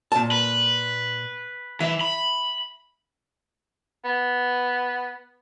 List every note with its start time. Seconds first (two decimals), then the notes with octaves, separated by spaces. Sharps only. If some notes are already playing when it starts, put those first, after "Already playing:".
0.12 A#2 A5
0.32 B4
1.80 E3 E5
2.01 B5
4.05 B3